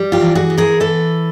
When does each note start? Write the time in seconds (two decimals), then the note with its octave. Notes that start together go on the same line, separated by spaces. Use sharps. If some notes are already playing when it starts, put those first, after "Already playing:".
Already playing: G3
0.12 F4 G4
0.21 E3
0.35 F#4 G#4
0.50 B3
0.57 G#4 A#4
0.80 E3 A4 B4